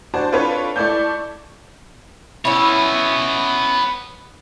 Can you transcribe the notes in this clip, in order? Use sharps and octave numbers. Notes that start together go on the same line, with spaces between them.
D4 F#4 C5 A5
C4 D4 F4 A4 B4 C#5
A3 E4 D5 A5 G6
B3 C#4 E4 C#5